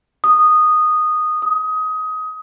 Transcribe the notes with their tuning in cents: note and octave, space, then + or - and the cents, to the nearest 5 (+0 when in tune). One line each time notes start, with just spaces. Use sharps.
D#6 -10
D#6 +20